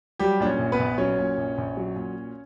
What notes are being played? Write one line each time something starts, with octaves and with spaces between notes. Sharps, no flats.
F#3 G3 G4
A#2 D4
C#4
A#1
B3 B4
A#1
F#3 C#4 C#5
A#2
A#1
A#1
F#3
A#2